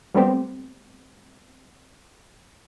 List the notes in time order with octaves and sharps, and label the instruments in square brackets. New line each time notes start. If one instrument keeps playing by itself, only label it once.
[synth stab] F#3 G3 A3 B3 C4 G4